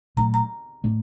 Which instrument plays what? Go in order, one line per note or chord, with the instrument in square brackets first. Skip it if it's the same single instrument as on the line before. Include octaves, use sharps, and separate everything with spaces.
[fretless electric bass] A#2 F#3 A3 D4 [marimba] A#5
[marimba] A#5
[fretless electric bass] A2 A3 D4